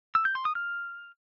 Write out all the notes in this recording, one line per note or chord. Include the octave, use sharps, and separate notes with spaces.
E6
G6
C6
D#6
F6